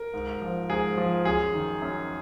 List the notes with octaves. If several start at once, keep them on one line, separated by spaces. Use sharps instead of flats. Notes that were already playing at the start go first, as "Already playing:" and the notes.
Already playing: A#4
G#2
F3
G#2 G#4
F3
F#2 G#4
D#3
F#2